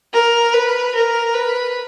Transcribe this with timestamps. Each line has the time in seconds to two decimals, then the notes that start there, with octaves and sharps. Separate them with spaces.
0.13 A#4
0.54 B4
0.94 A#4
1.34 B4